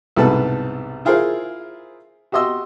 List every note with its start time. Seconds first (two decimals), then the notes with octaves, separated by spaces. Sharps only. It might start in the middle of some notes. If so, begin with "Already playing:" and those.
0.16 C2 G#2 B2 A4 B4 A5
1.05 E4 F4 G#4 A#4 C5 F5
2.32 F#4 G4 D#5 C6 E6